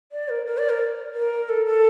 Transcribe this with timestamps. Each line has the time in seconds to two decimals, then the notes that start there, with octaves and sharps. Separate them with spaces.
0.12 D5
0.29 A#4
0.46 A#4
0.58 D5
0.69 A#4
1.15 A#4
1.49 A4
1.66 A4